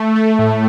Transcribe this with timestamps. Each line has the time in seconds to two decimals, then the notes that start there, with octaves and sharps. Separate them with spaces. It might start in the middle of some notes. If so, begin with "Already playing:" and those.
Already playing: A3
0.16 A3
0.39 A2